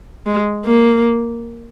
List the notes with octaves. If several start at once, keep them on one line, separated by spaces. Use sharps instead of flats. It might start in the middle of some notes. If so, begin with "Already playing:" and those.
G#3
A#3